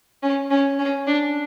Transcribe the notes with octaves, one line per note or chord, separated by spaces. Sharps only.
C#4
C#4
C#4
D4